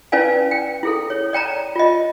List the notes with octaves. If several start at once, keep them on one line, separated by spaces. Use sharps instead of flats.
C#4 E4 B4 D5 F5 G#5
G5
E4 G#4 A4
C#5
D5 G5 A5 A#5
F4 D#5